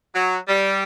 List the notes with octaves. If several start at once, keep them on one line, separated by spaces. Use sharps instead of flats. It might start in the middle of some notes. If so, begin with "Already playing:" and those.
F#3
G3